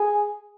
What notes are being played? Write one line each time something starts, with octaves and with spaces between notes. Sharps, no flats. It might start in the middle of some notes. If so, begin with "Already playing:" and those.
Already playing: G#4 G#5